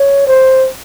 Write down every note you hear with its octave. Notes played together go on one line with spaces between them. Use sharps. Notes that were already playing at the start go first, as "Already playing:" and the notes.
Already playing: C#5
C5